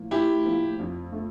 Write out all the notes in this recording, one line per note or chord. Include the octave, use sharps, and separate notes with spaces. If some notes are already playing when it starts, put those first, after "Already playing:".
Already playing: A2 F3 A#3
A2 E4 G4
F3 A#3
F2
A3